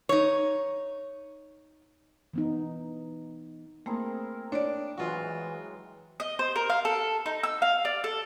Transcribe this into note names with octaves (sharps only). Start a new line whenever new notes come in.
D#4 C#5
E3 B3 D#4
A3 A#3 C4 E4 G#4 A#4
D4 C#5 D5
E3 F#3 G#3 F4 F#4
D#5
C5
A#4
F5
A4
D#4
E6
F5
D5
A4